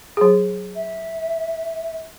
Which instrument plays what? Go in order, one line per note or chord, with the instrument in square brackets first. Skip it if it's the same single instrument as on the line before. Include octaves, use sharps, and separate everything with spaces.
[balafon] F#3 G#4
[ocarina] E5